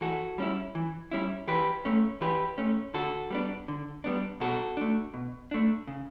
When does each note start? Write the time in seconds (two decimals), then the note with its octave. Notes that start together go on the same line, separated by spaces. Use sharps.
0.01 E3 F#4 A4
0.38 G3 C#4 E4
0.75 E3
1.11 G3 C#4 E4
1.47 E3 G4 B4
1.85 A3 C#4
2.21 E3 G4 B4
2.58 A3 C#4
2.94 D3 F#4 A4
3.30 G3 B3 D4
3.68 D3
4.04 G3 B3 D4
4.40 B2 F#4 A4
4.77 A3 D4
5.14 B2
5.51 A3 D4
5.88 C#3